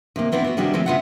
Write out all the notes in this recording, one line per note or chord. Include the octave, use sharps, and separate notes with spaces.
C3 D#3 A#3
E3 B3 C4 D4 E4
B3 F#4
C3 D#3 G3 D4 F#4 G#4
D#3 F3 G#3 A3 C4
C#3 B3 F4 E5 F#5